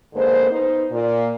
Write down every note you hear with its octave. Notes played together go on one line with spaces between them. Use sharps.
G#2 D3 A#3 B3 C5
B3 D#4 C5
A#2